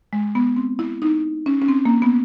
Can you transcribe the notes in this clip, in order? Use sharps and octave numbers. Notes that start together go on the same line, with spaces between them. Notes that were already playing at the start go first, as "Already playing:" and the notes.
G#3
B3
C4
E4
D#4
C#4
C#4
C4
A#3
B3